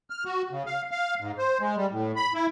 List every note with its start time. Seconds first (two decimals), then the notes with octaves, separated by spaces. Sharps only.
0.10 F6
0.25 F#4
0.51 C#3
0.66 F5
0.91 F5
1.21 G#2
1.38 C5
1.60 G#3
1.76 G3
1.92 A2
2.16 B5
2.34 E4